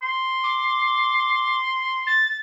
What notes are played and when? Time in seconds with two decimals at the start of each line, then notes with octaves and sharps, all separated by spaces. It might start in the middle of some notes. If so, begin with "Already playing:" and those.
0.02 C6
0.44 D6
2.07 A6